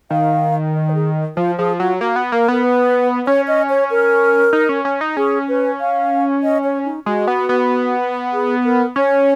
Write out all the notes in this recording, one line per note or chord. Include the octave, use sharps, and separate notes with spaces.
D#3 F5
D#5
A#4
G#4
F3 F4
F3 G#4
F#3 F4
A#3 F#4
B3
A#3 A#4
B3 A#4
B4
C#4 C#5
D#5
C#5
A#4
D#4
C#4
C#4
D#4
C#4 G#4
B4
F5
D#5
C#5
D#4
G#3 F#4
B3
B3
G#4
A#4
C#4 C#5